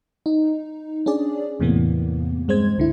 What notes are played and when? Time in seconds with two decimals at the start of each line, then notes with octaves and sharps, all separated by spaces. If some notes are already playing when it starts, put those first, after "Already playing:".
0.26 D#4
1.06 C#4 D4 G#4 D5
1.60 E2 A2 C3 E3 A#3 B3
2.48 G2 G#3 C4 C5 G#6
2.78 C#2 D3 E4